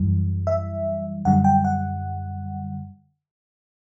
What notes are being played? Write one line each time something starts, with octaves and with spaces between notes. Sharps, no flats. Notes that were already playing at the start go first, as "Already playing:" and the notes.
Already playing: F#2 E3 G3
E5
F#2 D3 G3 F#5
G5
F#5